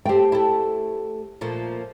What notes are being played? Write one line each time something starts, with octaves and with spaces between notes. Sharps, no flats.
A3 C4 G4 G5
A3 E4
A#2 F3 A3